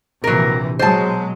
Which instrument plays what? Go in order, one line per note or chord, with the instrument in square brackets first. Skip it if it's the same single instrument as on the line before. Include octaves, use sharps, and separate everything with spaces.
[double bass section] A#1 C3 E3 [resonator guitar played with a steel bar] F#3 A#4
[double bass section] B2 F#3 G#3 [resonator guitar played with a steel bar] C5 A5